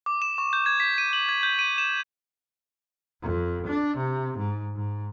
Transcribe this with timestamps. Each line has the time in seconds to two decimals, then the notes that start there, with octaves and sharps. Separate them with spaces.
0.06 D6
0.22 E7
0.38 C#6
0.53 G6
0.66 G#6
0.80 B6
0.98 D#7
1.13 F#7
1.29 G#6
1.43 G6
1.59 D#7
1.78 E7
3.23 F2
3.67 D4
3.97 C3
4.38 G#2
4.76 G#2